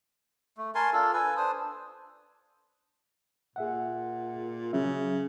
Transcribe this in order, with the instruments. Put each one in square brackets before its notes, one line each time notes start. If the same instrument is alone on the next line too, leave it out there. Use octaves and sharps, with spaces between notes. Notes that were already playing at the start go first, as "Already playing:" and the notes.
[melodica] A3
A#4 G#5 A5 C6
D4 F4 A4
A4 B4 G#5
D4 C5 D#6
[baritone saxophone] A#2 [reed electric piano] G#4 E5 F#5
[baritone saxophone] C#3 [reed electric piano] F#3 C#4 E5